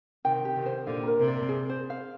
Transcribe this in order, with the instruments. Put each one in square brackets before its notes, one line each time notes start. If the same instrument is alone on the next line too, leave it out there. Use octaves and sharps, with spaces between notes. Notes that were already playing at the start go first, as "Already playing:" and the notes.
[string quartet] C3 D#3 [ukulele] G5
[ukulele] G4
[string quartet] C3 D#3
[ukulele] C5
[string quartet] A#2 D3 [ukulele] F5
[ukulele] A#4
[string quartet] C3
[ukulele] D5
G#4
C5
F5